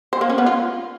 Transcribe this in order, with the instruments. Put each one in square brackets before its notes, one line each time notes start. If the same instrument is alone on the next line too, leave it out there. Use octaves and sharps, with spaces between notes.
[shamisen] C5
A#3
C#4
B3
F4